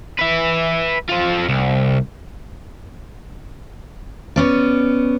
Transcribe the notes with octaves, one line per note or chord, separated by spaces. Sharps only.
B4 E5
C4 F4
C2
B3 C#4 D5